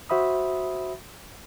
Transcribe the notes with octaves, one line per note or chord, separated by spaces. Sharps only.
F#4 C5 E5 B5 D#6